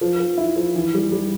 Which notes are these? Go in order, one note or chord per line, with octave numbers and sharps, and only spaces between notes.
F3
F3
E4
F3
E3
G3
G3